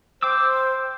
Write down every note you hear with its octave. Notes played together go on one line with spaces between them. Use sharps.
C5 G5 D6 E6